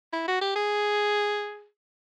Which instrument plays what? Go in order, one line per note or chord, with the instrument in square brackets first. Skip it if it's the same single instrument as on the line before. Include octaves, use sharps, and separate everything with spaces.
[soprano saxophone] E4
F#4
G4
G#4